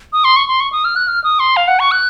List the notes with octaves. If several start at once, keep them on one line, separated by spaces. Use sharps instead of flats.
D#6
C6
C#6
C6
C#6
D#6
F6
F#6
F6
D#6
C6
F5
F#5
C#6
F#6